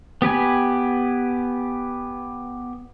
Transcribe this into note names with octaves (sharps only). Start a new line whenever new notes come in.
B3 G4 B4 G#5